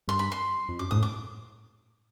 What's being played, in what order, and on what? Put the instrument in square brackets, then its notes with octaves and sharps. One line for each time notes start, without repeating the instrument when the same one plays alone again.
[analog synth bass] G2 [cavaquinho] C6
[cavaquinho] B5
C6
[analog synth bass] F2
[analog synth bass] F#2 [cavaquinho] D6
[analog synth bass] G#2 [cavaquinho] D#6
[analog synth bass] A2
[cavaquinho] D6